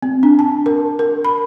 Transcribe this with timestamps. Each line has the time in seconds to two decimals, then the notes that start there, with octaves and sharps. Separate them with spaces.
0.02 C4
0.23 D4
0.39 A5
0.66 A#4
0.99 A#4
1.25 B5